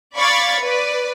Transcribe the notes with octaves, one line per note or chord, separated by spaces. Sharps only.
D5 F5 B5 C#6 G#6 A6
B4 D5